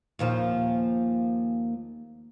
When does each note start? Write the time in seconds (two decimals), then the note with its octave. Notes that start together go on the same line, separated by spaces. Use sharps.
0.19 D#2 A#2 F3